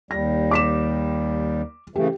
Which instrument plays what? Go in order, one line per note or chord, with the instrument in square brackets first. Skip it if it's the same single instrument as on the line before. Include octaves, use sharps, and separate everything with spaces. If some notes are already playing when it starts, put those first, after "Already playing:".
[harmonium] D#2 G3 [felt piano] A#6
[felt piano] D6 B6 E7
[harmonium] C#3 E3 A3 [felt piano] G4